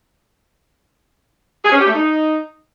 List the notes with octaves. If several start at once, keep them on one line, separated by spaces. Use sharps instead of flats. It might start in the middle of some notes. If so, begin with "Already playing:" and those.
G#4
C#4
G4
A3
D#4